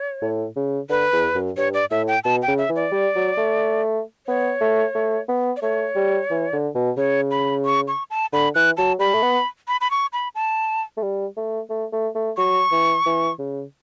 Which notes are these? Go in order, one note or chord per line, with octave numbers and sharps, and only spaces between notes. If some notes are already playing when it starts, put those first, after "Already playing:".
Already playing: C#5
A2
C#3
D3 B4
E2
F#2
G2 C#5
D5
A2 E5
G5
B2 A5
G5
C#3
E5
E3
D5
G3
F#3
A3
B3 C#5
A3
A3
B3
D5
A3 C#5
G3
E3
D3
B2
C#3 C#5
B5
C#6
C#6
A5
D3 B5
E3 F#6
F#3 A5
G3 B5
A3
B3
B5
B5
C#6
B5
A5
A3
G3
A3
A3
A3
A3
F#3 C#6
E3
E3
C#3